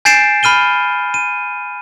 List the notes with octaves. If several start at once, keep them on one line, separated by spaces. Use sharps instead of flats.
G#5 G6 A6 C7 D7 E7
B5 F6 D#7 G7
D#7